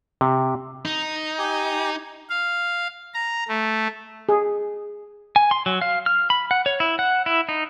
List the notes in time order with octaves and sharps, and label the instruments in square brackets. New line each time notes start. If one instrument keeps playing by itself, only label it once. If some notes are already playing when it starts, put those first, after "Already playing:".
[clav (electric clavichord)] C3
[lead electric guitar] D#4
[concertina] G4 G#5
[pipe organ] F5
A#5
A3
[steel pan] G#4
[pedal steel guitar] G#5
C6
F#3
F5
F6
B5
F#5
C#5
E4
F#5
E4
D#4